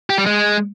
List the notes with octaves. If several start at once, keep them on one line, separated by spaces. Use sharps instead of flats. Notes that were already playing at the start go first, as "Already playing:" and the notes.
G4
G3
G#3